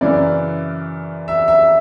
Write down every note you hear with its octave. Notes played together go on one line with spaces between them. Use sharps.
F#2 C#3 E3 D5
E5
E5